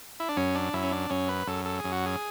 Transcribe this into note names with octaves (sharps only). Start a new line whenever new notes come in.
E4
D4
F#2 C#4
D4
F#2 E4
C#4
D4
F#2 C#4
B4
F#2 A4
A4
G#4
F#2
F#4
G#4